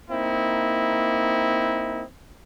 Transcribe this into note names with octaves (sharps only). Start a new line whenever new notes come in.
A#3 C4 D#4 E4